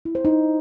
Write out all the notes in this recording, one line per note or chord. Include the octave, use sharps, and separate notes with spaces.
E4
C5
D#4